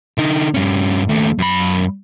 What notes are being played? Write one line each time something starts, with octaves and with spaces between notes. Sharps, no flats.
D3 D#4
G2 C#4
D#2 A3
F#2 B5